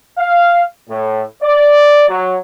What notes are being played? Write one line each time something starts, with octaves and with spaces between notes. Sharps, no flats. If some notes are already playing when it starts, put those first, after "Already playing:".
F5
A2
D5
F#3